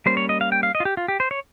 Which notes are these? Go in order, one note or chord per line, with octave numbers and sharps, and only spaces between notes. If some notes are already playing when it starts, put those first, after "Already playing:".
G3 A#3 C#4 C5
C#5
D#5
F5
G5
F5
D#5
F4
G4
F4
G4
C5
C#5